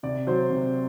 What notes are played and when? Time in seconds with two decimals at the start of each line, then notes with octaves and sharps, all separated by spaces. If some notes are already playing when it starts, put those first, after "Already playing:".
0.03 C3 D5
0.27 F#3 C5
0.50 C3